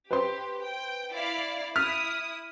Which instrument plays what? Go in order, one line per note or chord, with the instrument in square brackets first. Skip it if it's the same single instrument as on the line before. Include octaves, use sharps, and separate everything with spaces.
[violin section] G4 [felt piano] B4 C5 C6
[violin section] G5
E4 D5 F5
[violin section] E4 D#6 [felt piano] F6 B6